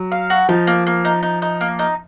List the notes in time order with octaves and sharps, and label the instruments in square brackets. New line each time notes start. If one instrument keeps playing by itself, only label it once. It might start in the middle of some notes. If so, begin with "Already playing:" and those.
Already playing: [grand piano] F#3
[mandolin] F5
F#4
[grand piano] F3 [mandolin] D#4
[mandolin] A#3
A#3
D#4
D#4
D#4
A#3
D#4